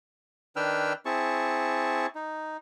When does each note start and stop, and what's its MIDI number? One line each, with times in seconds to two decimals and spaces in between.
0.56 0.93 51
0.56 0.93 62
0.56 0.93 71
0.56 0.93 79
0.56 0.93 88
0.56 0.93 89
1.06 2.06 60
1.06 2.06 64
1.06 2.06 68
1.06 2.06 81
1.06 2.06 85
2.15 2.57 63